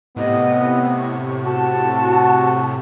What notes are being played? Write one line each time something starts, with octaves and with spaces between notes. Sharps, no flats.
A2 C3 B3 D#5
C#6
F#4 A5
F#4